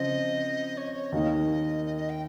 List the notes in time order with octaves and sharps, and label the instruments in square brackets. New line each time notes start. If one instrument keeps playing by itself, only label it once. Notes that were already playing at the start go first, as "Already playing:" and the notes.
Already playing: [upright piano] C#3 F3 C4 F4 [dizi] D#5
[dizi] C#5
C#5
[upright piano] D#2 D#3 A#3 D#4 [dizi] D#5
[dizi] D#5
D#5
G5